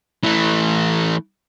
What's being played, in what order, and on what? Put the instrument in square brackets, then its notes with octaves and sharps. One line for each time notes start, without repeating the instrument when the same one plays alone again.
[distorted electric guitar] E3 A3